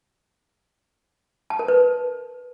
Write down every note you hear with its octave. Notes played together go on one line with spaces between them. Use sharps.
A5
A#4
B4